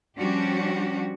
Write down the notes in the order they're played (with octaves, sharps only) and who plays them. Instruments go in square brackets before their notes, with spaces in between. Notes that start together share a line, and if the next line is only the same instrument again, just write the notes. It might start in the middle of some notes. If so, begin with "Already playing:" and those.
[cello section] F3 G3 C#4 D4 F#4 G4